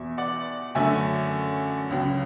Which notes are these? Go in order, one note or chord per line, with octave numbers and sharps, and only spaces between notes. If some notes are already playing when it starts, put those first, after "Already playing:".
Already playing: E2 B2 E5
D5 F#5
F#2 D3 A3 C#4 E5 G#5
C#2 C#3 F#3